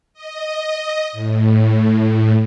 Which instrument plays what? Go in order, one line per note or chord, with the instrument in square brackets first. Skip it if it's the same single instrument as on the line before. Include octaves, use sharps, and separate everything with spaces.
[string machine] D#5
A2